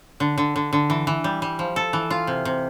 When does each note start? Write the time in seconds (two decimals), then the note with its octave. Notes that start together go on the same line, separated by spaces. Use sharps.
0.20 D3
0.38 D3
0.56 D3
0.73 D3
0.90 E3
1.07 E3
1.24 G3
1.42 G3
1.59 F3
1.76 A4
1.93 E3
2.10 F4
2.27 C3
2.45 C3